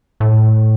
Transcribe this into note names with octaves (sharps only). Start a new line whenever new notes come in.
A2